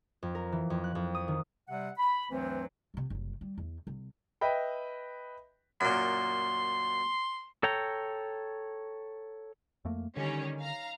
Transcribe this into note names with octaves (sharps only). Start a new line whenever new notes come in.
F2
A#4
E3
F2
F#6
F2
D#6
D#3
C3 G3 F#5
B5
D2 G2 E3 F#3 C4
C3 F3
F#1 C2
G3
E2
C2
B4 D#5 E5 G5 B5
F#2 A#2 C6
A4 C#5 G5 A#5
F2 A3 A#3
D3 D#3 G3 C#4
F5 A#5